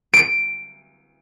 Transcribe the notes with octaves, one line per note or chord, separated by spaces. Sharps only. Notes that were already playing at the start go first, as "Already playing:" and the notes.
D7